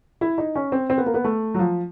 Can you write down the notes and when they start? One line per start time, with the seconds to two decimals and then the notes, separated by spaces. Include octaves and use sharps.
0.21 E4
0.38 D#4
0.55 C#4
0.72 C4
0.90 C4
0.98 B3
1.06 A#3
1.14 B3
1.24 A3
1.54 F#3
1.59 F3